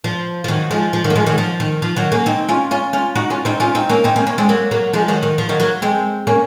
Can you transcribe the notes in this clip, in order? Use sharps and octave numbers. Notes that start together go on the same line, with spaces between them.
F3
F3
D#3 F#3
F3 G#3
F3
D#3 F#3
A#3
F3 G#3
D#3 F#3
F3
D#3
F3
D#3 F#3
A#3 C#4
C4 D#4
C#4 F4
C#4 F4
C#4 F4
D#4 F#4
C#4 F4
C4 D#4
C#4 F4
C4 D#4
A#3 C#4
C4 D#4
A#3 C#4
A#3 C#4
G#3 C4
F#3 A#3
F#3 A#3
F3 G#3
D#3 F#3
D#3
F3
D#3 F#3
F#3 A#3
G#3 C4
A#3 C#4